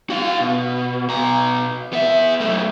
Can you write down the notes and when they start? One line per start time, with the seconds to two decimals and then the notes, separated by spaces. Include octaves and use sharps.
0.10 F#4 F5
0.40 B2
1.08 B2 A#5
1.93 B3 E5
2.41 F#2 A3